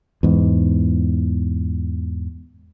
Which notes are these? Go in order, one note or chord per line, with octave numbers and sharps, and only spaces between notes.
E2 G#2